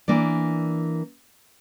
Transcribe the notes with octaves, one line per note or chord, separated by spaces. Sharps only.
E3 A#3 D4 D5